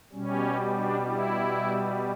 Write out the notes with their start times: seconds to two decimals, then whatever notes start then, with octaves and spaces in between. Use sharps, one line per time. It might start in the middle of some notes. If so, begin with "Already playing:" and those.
0.12 B2 G3 C#4
0.75 D4
1.06 E4